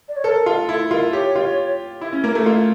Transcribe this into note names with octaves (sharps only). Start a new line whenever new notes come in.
D5
C#5
A4 A#4
F4
E4 A4
F4 A#4
G4 C#5
F4
E4
C#4
A#3
A3
F4